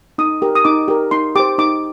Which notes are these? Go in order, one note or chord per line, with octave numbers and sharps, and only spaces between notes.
D#4 D#6
G4 A#4
D#6
D#4 D6
G4 A#4
D#4 C6
G4 C5 D6
D#4 D6